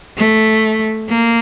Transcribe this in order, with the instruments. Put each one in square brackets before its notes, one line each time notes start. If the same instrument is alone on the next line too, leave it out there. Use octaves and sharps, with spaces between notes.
[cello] A3
A#3